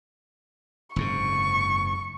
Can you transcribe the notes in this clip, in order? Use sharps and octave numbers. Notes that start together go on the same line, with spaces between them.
F#1 G#2 C3 C#6